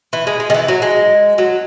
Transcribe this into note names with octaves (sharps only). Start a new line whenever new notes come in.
E3
G#3
G#3
D#3
E3
F#3
G#3
F#3